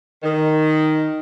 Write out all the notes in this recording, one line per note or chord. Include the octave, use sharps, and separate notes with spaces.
D#3